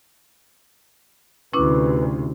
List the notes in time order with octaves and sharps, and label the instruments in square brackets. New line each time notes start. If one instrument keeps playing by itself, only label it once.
[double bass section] D2 C3 [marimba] C#4 E4 D6 [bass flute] B4